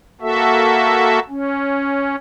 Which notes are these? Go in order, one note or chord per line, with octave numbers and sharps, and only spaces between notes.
A#3 F#4 A4 E5
C#4